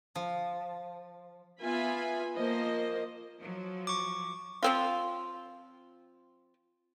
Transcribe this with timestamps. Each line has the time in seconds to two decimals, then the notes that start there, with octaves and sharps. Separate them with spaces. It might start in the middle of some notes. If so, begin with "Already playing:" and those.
0.16 F3
1.61 B3 F4 E5 G#5 B5
2.36 F3 A#3 C5 D#5
3.39 F3 F#3
3.87 C#6 D6
4.63 F3 C4 F4